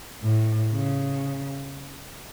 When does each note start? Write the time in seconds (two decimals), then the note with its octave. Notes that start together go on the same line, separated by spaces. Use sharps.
0.22 A2
0.72 C#3